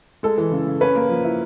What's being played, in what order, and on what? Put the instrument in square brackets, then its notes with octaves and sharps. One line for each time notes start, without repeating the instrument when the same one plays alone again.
[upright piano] G#3 A4
E3
C#3
C#3
C#4 B4
A#3
F3
E4